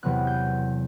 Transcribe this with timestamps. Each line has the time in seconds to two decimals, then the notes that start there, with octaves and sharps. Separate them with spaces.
0.03 E2 C3 F#3 B3 F#6
0.27 G6